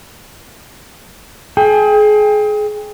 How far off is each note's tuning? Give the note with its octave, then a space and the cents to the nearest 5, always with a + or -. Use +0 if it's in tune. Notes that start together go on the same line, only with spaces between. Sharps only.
G#4 +30 G5 +30